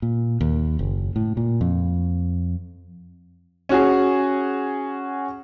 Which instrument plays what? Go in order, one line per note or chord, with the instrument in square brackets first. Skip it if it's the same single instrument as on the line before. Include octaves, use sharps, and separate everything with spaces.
[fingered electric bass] A#2
D#2
F#1
A2
A#2
F2
[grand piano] C#4 F#4 G#4